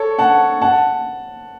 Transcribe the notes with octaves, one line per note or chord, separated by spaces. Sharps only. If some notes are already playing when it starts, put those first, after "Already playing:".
Already playing: A4 C#5
F#5 A5
F#5 A5